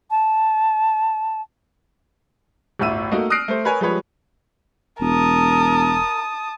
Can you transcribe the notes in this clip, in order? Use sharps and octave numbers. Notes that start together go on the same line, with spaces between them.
A5
G1 D2 A2 E5 E6 D#7
A3 A#3 D#4 F#4
D#6 F6 F#6 A#6 C7 D7
A3 C5
A#4 B4 C#5 G#5
F3 G3 G#3 B4 C#5
E1 A#4 A5 D#6